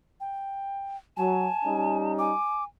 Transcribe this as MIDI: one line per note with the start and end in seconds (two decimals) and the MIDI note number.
0.20 0.97 79
1.17 1.47 54
1.17 1.96 80
1.17 2.13 81
1.65 2.33 55
1.65 2.33 61
1.65 2.33 63
2.18 2.66 80
2.18 2.64 86